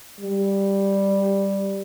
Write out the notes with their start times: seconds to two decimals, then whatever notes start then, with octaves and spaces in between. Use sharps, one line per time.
0.21 G3